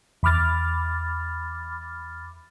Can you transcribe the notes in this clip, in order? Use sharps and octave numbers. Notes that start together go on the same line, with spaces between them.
E2 B5 D6 F6 A6